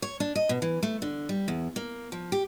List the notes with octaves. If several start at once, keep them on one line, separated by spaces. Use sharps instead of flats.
C#5
D4
D#5
B2
E3
A3
D3
G3
E2
A#3
F3
G4